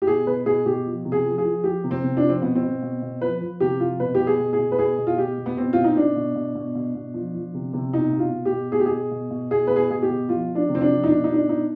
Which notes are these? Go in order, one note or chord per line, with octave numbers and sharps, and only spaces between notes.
G4
B2 G#4
B2 B4
B2 G#4
B2 G4
F3
C3
G#4
F3
G#4
F3
F3 G4
C3
C4
C3
D4
F3
C4
B2 B3
C4
B2
B2
B2
F3 B4
F3
C3 G4
F3 F4
B2 B4
B2 G4
G#4
B2
G#4
B2
B4
B2 G#4
B2
F4
B2 G4
B2
B3
B2 C4
B2 F4
D#4
B2 D4
B2
B2
B2
B2
B2
F3
F3
C3
C3
B2 D#4
B2
F4
B2
G4
B2
B2 G#4
G4
G#4
B2
B2
B2
B2 G#4
B2 B4
G#4
B2 G#4
G4
B2
F3 F4
F3
D4
C3
C4
D4
F3
D#4
B2 D4
B2 D#4
D4
B2 D#4